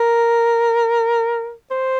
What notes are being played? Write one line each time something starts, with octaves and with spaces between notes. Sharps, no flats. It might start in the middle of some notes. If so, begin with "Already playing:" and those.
Already playing: A#4
C5